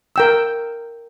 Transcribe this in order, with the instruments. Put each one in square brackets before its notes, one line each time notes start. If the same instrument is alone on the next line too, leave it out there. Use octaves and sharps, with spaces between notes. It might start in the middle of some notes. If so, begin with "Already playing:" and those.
[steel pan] A#4 G5 E6